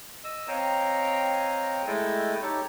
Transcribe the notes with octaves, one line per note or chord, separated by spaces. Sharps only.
D#5 E6
C4 C#5 D#5 F5 G5 A#5
G#3 A3 E4 A4 D#5 G5
D#4 G4 A4 C#5